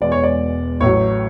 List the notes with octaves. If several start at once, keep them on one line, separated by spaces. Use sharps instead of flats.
E1 E2 B2 G#3 D5
C#5
D5
A1 A2 F#3 C#5